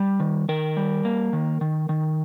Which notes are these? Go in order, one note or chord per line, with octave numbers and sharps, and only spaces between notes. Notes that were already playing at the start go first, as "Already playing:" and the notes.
Already playing: G3
D#3
D#3 A#4
G3
A#3
D#3
D#3
D#3